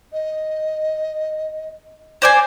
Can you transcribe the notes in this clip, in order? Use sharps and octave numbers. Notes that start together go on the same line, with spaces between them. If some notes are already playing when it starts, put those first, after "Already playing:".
D#5
C5 D5 G#5